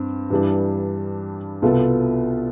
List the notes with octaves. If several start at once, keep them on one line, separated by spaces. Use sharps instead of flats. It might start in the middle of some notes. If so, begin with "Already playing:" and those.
Already playing: G2 C4
G2 E3 G3 D4
C2 B2 B3 F4 A4